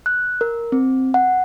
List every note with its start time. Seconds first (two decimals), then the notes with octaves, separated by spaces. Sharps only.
0.06 F#6
0.41 A#4
0.72 C4
1.14 F#5